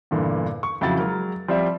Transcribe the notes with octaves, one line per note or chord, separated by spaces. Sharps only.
E2 G2 A#2 D3 E3
C#6
F2 C#3 F#3 E4 F#4 A6
F#3 G#3 A#4
F3 G3 C4 D5 E5